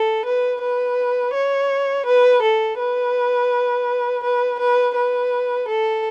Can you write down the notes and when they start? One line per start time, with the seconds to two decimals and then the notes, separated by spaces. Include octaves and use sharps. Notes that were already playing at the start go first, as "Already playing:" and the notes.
Already playing: A4
0.26 B4
0.61 B4
1.34 C#5
2.06 B4
2.42 A4
2.79 B4
4.23 B4
4.60 B4
4.95 B4
5.68 A4